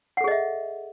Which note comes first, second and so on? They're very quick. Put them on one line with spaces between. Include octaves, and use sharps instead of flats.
F#5 A4 G#4 D#5 E5